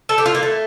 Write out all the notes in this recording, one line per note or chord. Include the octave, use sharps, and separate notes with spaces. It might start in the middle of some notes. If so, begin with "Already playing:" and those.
A4
G4
F4
A#3
A3